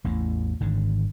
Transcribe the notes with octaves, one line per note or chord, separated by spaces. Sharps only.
A1 E2 A2
G#1 G#2 D3